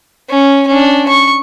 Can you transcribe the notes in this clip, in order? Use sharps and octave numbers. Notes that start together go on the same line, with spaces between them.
C#4
C#4 D4
C#6